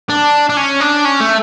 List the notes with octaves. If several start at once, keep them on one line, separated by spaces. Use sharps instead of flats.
D4
D4
C#4
D4
C#4
A3